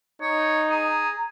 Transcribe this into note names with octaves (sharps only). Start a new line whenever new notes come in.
D#4 C#5
G#4 A#5